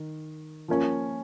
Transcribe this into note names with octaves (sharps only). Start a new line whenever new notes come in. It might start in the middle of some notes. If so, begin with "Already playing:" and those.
Already playing: D#3
F3 A#3 C#4